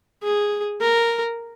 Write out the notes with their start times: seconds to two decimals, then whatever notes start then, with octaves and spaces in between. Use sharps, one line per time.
0.23 G#4
0.81 A#4